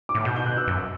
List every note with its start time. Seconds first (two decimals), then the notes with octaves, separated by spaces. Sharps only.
0.09 D6
0.15 A2
0.25 B2 G6
0.36 G6
0.46 F#6
0.57 E6
0.67 F#2